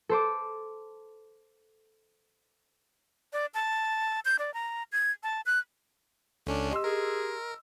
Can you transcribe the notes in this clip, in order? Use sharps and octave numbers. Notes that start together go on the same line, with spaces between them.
A4 C5 D6
D5
A5
G6
D5
A#5
G#6
A5
F#6
C#2 C#4 D4 A4
G4 D#5 C6 E6
G#4 A#4